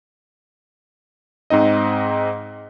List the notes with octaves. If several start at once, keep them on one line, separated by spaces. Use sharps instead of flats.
G#2 C4 D#4 D#5